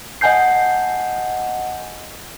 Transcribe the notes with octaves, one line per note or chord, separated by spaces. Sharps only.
D#5 F#5 G#5 A5 G6 C7